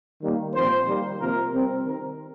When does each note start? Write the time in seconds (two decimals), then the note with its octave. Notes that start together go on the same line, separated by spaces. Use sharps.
0.22 D#3 G3 A#3
0.54 A#2 F3 C4 C5
0.87 D#3 G3 A#3
1.20 C3 F3 A#3 A#4
1.53 C3 G3 C4
1.85 D#3 C4 A#4